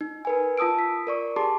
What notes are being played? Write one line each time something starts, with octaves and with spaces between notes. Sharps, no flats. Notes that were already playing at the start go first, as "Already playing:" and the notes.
D#4
A#4 B4 G#5
F4 A5 D#6 E6 D7
B6
A#4 D5 C#6
G4 G#4 A5 C6 D6